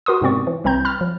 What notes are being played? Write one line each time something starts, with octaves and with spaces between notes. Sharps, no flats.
F#4 A#4 C6 D#6
G#2 C3 B3 C4 D5 C#6
E3
C2 E3 C4 A#5 G6
B5 F6 A6
F3